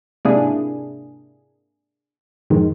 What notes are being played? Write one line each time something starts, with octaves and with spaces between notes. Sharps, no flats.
G#2 C3 A#3 D4 E4 G#4
F2 G#2 D#3 G#3